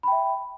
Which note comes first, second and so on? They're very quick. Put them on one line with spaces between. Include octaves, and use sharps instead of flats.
B5 G5 E5